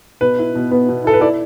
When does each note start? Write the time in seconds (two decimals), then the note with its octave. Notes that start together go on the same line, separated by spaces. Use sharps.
0.21 B2 B4
0.39 E4
0.55 B2
0.71 B3 B4
0.89 B2
1.04 E4 A4
1.13 B4
1.21 E4 A4 D5